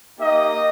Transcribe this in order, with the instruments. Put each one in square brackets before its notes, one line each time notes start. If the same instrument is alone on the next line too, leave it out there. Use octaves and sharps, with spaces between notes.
[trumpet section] A#3 D#4 G4 D#5